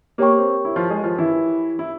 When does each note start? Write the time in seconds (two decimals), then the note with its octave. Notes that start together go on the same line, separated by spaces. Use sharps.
0.18 A#3 G4 A#4 C#5 G5 C#6
0.38 C4
0.65 E4
0.76 F3 F4
0.90 G#3 G#4
1.04 F3 F4
1.18 E3 E4
1.79 E4